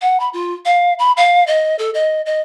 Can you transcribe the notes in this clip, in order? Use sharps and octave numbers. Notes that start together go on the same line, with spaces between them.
F#5
B5
F4
F5
B5
F5
D#5
A4
D#5
D#5